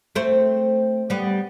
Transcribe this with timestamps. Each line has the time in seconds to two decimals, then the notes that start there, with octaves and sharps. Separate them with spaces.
0.15 A3 C4
1.10 G3 B3